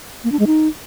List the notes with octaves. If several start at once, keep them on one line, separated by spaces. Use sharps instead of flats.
A#3
D4
G#3
D#4